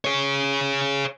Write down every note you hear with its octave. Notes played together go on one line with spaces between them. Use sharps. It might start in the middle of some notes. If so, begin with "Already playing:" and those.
G#4 C#5